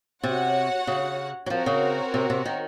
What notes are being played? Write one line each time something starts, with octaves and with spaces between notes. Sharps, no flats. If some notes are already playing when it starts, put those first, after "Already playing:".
C3 F#4 C#5 F#5
C#3
F#3
F3 C4 F#4 A#4 C#5
C#3
C3
C3
D#3